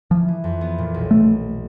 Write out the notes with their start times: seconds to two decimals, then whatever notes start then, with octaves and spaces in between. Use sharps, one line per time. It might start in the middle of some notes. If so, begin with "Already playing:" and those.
0.11 E3 F3
0.28 E3
0.44 F2
0.61 B3
0.78 A#2
0.94 B1
1.11 A3